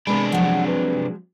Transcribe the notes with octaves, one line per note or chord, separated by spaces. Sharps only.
C3 G#3 B3 D4 A#4 B5
F3 F#3 F#5
B4